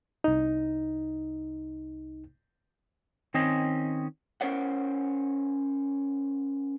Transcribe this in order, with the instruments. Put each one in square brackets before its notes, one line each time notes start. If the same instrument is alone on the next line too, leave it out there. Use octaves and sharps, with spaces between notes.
[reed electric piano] C2 D#4
[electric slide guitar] D#3 C4 C#4 D#5
[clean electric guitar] C#4 A#4 C5 C#5 F#5